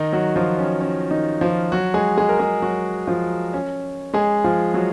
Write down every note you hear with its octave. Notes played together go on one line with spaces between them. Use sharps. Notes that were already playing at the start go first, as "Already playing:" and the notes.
Already playing: D#3 D#4
F#3 F#4
F3 F4
C#4
C#4
D#3 D#4
F3 F4
F#3 F#4
G#3 G#4
G#3 G#4
A#4
G#3 G#4
F#3 F#4
F3 F4
C#4
G#3 G#4
F3 F4
F#3 F#4